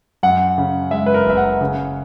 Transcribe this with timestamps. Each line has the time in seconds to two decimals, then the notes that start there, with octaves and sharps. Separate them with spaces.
0.23 F#2 F#5
0.58 C#3
0.91 G#3 E5
1.06 B4
1.14 A#4
1.26 F#1 E5
1.37 F#5
1.61 C#3